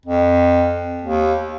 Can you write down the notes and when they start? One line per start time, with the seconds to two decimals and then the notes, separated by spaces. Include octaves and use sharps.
0.06 F2
1.01 D#2